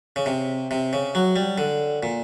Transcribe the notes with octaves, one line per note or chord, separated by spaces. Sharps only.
C#3
C3
C3
C#3
F#3
G3
D3
A#2